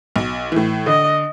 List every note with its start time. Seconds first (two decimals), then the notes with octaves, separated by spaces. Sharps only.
0.16 B1
0.52 A2 E3
0.86 D3 D#5